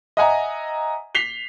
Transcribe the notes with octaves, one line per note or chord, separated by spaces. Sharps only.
D#5 E5 F#5 G#5 A#5
B6 C7 F7 G7